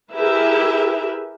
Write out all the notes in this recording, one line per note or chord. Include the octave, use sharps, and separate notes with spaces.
E4 G4 G#4 A#4 B4 E5